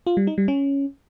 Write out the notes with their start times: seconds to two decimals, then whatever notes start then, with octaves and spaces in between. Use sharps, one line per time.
0.07 F4
0.17 G3
0.27 D#4
0.38 G3
0.48 C#4